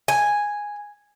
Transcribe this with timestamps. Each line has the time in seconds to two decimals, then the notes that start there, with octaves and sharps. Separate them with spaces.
0.08 G#5